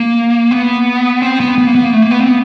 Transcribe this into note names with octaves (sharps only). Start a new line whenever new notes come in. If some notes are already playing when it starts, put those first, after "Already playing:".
Already playing: A#3
B3
C4
B3
B3
A#3
B3
A#3
A3
A#3
B3
C4
B3